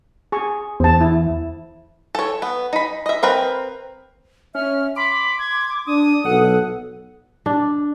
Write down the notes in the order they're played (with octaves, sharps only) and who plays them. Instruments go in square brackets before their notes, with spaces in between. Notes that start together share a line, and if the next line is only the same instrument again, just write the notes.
[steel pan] G#4 G#5 C#6
[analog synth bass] E2 [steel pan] C5 A5
[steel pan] E4
[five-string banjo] A4 C#5
B3
D#4 B5
D#5 E5
C4 A#4 B4
[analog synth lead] C#4 [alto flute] E5 [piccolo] F6
[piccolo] B5 [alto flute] C6 [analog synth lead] D6
[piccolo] G#6
[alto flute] D4 [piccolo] D#6
[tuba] B1 [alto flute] A4 [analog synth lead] F#5
[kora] D4